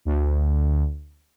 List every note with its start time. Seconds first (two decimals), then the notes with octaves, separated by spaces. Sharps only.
0.05 D2